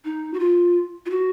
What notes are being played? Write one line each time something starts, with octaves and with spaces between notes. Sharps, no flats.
D#4
F#4
F4
F4
F#4